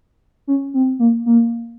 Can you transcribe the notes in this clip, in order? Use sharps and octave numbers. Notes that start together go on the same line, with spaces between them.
C#4
C4
A#3
A#3